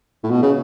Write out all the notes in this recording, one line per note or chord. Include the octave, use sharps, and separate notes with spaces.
A2
B2
C#3